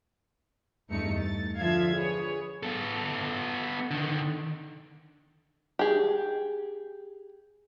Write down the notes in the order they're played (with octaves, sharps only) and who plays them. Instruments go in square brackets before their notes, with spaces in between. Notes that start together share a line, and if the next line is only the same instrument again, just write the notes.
[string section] E2 G2 A3 D#4 C#7
A6
D3 F3 E5 F5 G#6
G#4 B4 C#5
[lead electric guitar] B3 A4
D3 D#3
[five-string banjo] G4 G#4